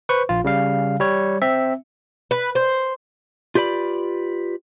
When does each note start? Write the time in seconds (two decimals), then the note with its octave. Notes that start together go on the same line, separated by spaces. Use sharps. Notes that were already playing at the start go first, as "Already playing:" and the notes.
0.09 B4 C5 C#6
0.29 A#1 F4
0.44 C#3 G3 F5
1.00 G3 C#5
1.42 C4 E5
2.31 B4
2.55 C5
3.55 F4 G4 B4 D5 B5